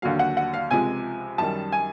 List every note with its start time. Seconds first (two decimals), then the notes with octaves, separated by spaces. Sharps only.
0.02 D#2 D3 F#3 F5
0.19 F#5
0.37 F#5
0.54 F5
0.70 C#2 C3 F3 G#3 G#5
1.38 F#2 D#3 G3 A5
1.72 G#5